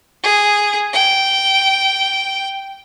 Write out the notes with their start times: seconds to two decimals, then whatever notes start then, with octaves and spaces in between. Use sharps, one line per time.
0.23 G#4
0.93 G5